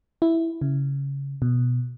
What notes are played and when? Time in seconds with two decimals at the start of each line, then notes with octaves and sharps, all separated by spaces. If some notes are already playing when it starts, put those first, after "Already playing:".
0.22 E4
0.61 C#3
1.42 B2